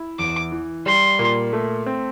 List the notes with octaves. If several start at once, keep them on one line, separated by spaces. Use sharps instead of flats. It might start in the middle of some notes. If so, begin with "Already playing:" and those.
Already playing: E4
E2 D6
E3
G3 C6
A#2
A3
C4